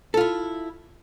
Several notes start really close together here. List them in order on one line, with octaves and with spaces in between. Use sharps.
A4 F4 E4